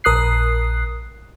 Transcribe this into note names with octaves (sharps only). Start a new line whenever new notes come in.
A#1 A#4 D#6 F#6 C7